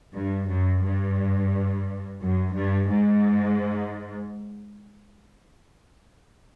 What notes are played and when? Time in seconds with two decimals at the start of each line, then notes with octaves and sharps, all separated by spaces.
0.14 G2
0.48 F#2
0.83 G2
2.21 F#2
2.55 G2
2.90 G#2